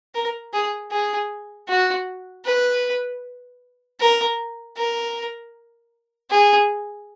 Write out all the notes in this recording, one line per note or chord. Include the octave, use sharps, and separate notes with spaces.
A#4
G#4
G#4
F#4
B4
A#4
A#4
G#4